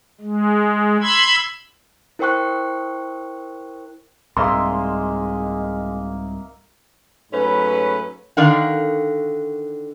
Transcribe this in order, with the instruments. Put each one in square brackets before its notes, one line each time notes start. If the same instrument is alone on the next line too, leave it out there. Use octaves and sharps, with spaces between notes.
[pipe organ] G#3
B5 C6 E6 G#6
[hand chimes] E4 A#4 C5 G5 C#6 F#6
[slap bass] C2 G#2 [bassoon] G#3 [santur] A#3 D#5 E5 [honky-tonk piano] C6
[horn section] G#2 F#3 A3 C#4 B4
[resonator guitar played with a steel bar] D3 D#3 A#4 F5 F#5